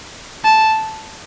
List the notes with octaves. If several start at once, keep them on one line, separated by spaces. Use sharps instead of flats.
A5